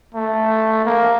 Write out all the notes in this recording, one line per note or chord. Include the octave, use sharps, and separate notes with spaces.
A3
A#3